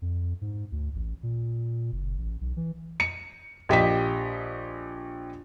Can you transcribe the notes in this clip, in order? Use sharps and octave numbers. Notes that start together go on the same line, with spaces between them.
F2
G#2
D2
A1
A#2
F#1
A1
B1
E3
C#7
A#1 G4 D#5 B6